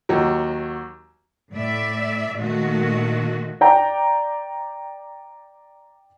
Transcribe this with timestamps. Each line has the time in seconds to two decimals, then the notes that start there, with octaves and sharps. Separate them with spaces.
0.09 D#2 F#3
1.52 A2 D5 E5
2.39 A#2 D#3 A3 F#4
3.61 D5 G5 A#5